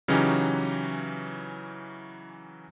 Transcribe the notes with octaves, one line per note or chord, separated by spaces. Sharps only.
C#3 E3 F#3 C#4 D#4 G4